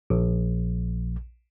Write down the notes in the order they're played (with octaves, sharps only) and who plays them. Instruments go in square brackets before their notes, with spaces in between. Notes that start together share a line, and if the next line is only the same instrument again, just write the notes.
[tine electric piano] A#1